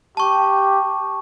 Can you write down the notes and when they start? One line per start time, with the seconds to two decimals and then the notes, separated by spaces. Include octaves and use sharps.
0.17 G4 A5 C#6